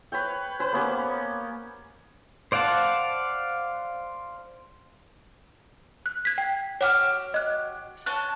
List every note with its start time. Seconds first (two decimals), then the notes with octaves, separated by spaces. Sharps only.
0.12 B4 C#5 G5
0.59 C#4 B4 C5
0.72 A#3 B3 C#4 G4
2.52 C5 D5 F5 F#5 A5
6.06 F#6
6.25 G#6 B6
6.38 G5
6.81 F#4 G4 C#5 F6
7.34 D#5 F#6
8.06 C#4 A5 F#6